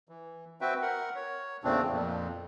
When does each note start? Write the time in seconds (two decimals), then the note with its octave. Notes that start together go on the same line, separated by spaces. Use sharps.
0.09 E3
0.61 C4 F#4 B4 E5 G5
0.82 A#4 F#5
1.15 C#5
1.64 E2 A#2 C#3 A3 C4 D4
1.92 F2 A#2